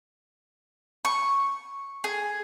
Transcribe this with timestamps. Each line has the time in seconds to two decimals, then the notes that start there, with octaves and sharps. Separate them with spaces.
1.05 C#6
2.04 G#4